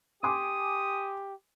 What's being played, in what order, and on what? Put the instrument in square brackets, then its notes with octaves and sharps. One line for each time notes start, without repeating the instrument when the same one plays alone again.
[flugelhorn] G4 [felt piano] G#5 C6 D6 [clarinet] D#6